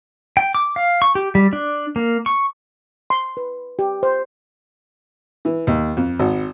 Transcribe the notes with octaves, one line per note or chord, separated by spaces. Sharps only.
G5
D6
F5
C#6
G4
G3
D4
A#3
C#6
C6
B4
G4
C5
E3
D#2
F2
G#1